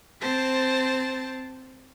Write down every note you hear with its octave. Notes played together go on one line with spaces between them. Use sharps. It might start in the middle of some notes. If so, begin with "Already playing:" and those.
C4 C5 A5 A6